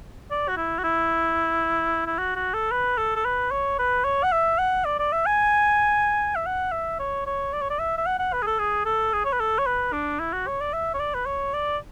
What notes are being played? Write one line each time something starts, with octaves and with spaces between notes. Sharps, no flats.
D5
F#4
E4
F#4
E4
E4
F#4
F#4
A4
B4
A4
A4
B4
C#5
B4
C#5
F#5
E5
F#5
D5
D5
E5
G#5
E5
F#5
E5
C#5
C#5
D5
C#5
D5
E5
E5
F#5
F#5
B4
G#4
A4
G#4
A4
G#4
C#5
B4
A4
C#5
B4
D4
E4
F#4
C#5
D5
E5
C#5
D5
B4
C#5
D5